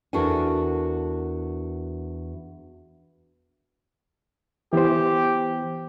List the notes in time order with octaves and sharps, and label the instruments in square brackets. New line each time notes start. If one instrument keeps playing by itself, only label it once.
[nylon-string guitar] E2 D4 F#4 A4 A#4 G#5
[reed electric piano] E3 B3 C5 [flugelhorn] G4